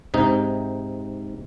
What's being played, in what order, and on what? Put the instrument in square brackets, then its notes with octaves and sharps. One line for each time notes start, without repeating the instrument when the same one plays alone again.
[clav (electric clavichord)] G#2 C3 D#4